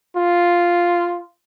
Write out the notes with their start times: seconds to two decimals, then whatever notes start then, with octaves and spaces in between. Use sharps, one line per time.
0.16 F4